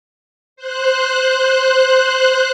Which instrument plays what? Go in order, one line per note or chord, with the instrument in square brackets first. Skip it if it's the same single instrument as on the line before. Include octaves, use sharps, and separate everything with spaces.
[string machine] C5 F#6